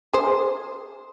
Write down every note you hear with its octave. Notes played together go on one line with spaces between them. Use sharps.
G#4 C5